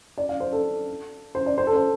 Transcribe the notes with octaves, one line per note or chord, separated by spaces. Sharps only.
D5
F5
C5
A4
C5
D5
C5
A4
C5